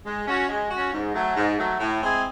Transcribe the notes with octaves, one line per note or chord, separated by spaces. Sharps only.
G#3
C#4 F#4
G#3
C#4 F#4
G#2
F#3 A3
G#2
F#3 A3
A2
G#3 C4 E4 G#4